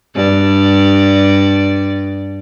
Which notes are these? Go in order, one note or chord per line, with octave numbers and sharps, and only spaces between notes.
G2 D5